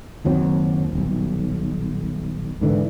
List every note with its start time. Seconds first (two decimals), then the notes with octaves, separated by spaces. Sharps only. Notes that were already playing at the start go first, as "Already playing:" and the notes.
0.25 F#1 D#2 F#3 C4
0.93 D#1 B1
2.61 G#2 D3 E3